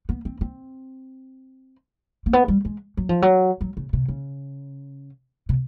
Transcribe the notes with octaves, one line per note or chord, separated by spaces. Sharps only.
B3
C4
C4
A#3
B3
G3
G#3
F#3
F3
F#3
F#3
C#3
C3
C#3
C3